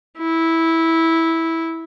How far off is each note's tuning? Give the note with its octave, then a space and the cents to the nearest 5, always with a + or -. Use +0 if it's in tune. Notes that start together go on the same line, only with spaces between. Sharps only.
E4 -10